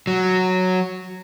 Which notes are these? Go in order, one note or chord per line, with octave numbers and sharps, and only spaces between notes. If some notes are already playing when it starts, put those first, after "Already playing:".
F#3